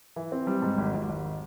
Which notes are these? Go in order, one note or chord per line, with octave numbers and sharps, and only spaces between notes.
E3
C4
G3
G#2
G#1
G#1
G#1